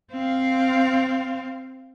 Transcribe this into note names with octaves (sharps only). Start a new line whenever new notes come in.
C4 F5